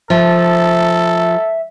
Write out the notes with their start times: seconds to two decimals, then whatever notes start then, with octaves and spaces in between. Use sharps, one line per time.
0.10 F3 A4 E5